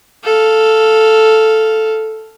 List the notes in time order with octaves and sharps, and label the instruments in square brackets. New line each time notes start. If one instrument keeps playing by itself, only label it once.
[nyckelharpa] A4 F5